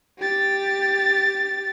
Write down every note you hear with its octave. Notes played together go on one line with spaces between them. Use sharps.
G4 A6